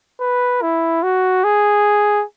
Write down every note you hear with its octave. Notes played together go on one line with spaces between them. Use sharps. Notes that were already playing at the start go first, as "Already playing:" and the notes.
B4
E4
F#4
G#4